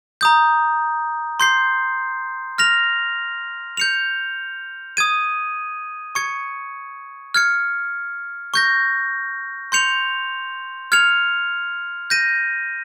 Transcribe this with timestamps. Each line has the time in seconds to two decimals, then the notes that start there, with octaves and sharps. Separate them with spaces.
0.21 A#5 D#6 G6
1.40 C6 G6 C7
2.58 F6 A#6 F7
3.77 G6 C#7 F7
4.97 D#6 G#6 D#7
6.15 C#6 G#6 C#7
7.34 F6 G#6 C#7
8.54 C#6 G6 A#6
9.72 C6 G6 C#7 F7
10.92 F6 G#6 C#7 F7
12.10 G6 A#6 D#7